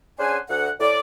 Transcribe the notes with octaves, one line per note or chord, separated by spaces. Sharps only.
C#4 D4 G#4 C5 F#5 G#5
D2 F#5
A2 D5